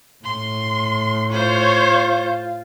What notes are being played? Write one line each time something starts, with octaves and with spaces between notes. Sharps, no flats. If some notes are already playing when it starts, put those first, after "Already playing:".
A2 C6
F4 C5 C#5